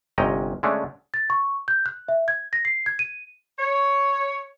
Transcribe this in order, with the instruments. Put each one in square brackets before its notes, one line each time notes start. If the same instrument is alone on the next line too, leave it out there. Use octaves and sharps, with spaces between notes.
[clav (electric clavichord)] G1 C3 C#4 D#5 G5 A#5
D3 G#3 A3 C#4 D4
[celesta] A6
C#6
G6
F#6
E5
G#6
A#6
C7
G#6
D#7
[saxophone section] C#5